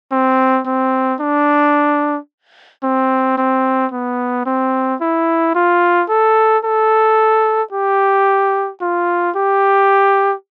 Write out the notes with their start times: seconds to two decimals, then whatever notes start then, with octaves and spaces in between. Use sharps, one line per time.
0.12 C4
0.66 C4
1.20 D4
2.83 C4
3.37 C4
3.92 B3
4.46 C4
5.01 E4
5.55 F4
6.09 A4
6.65 A4
7.73 G4
8.81 F4
9.36 G4